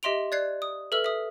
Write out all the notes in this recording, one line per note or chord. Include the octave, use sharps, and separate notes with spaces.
G4 D#5 E5 C6 D7 F7
D5 F#6 G#6 C7
D#6
A4 B4 E5 E6 F6
E5 D#6